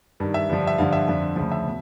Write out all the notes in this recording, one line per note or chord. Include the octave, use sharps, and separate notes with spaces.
G2 D#3
E5
G2 D3 F3
E5
G2 D3 F3 F5
E5
F2 D3 F3
D2 C#3 F3
E5
B2